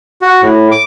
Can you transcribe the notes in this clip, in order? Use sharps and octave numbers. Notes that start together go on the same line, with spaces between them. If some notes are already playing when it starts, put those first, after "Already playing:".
F#4
A2
D6